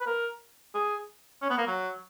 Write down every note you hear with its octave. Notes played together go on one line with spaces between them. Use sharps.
B4
A#4
G#4
C#4
B3
A#3
F#3